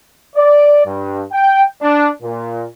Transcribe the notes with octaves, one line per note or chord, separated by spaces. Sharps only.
D5
G2
G5
D4
A#2